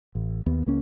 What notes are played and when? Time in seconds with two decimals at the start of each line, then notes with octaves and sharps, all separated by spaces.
0.15 A1
0.46 D#2 B3
0.66 C#2 A#3 C#4